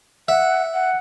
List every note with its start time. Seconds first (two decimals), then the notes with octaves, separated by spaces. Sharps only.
0.28 E5 F#5
0.74 F#5